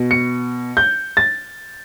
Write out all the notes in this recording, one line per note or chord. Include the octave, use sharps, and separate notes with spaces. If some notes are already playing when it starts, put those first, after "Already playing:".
Already playing: B2
C#7
G6
A6